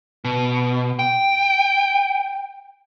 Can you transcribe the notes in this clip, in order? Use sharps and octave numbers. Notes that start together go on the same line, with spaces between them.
B2
G5